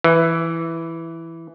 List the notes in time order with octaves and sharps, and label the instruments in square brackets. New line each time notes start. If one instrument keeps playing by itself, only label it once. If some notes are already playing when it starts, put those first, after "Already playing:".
[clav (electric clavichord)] E3